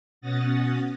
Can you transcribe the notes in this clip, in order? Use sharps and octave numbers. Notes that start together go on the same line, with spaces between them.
B2 C#4 F#5 D#6 A6 A#6